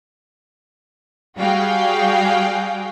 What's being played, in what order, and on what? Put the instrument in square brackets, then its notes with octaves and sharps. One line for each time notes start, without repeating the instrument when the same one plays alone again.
[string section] G3 F#4 G#4 F5 G5